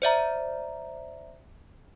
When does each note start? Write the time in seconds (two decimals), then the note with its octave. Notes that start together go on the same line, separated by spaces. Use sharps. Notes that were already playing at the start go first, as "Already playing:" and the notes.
0.02 C5 D5 E5 A#5